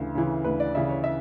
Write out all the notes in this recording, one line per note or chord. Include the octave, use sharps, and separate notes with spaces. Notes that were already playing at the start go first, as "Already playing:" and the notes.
Already playing: D2 C#3 E3
C#3 E3
D2 B4
D5
C#3 E3 E5
C#5
E5